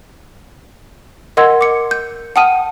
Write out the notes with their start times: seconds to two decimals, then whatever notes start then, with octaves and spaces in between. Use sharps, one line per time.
1.37 A#4 D#5 F#5 C6 E6 G#6
1.61 D6 C#7
1.91 G6
2.36 F#5 G5 A5 D#6 F6 D#7